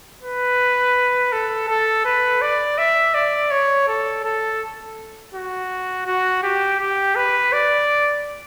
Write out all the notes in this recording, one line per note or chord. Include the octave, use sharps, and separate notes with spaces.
B4
A4
A4
B4
D5
E5
D5
C#5
A4
A4
F#4
F#4
G4
G4
B4
D5